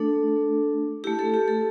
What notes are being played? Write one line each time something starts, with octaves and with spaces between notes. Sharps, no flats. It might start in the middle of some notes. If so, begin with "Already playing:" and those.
Already playing: A3 D4 A4
A3 E4 G4
A4
G4
A4